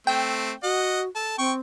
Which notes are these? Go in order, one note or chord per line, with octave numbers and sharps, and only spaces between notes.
A3 C4 G5
F#4 D#5 F#5
A4
C4 G5 C#6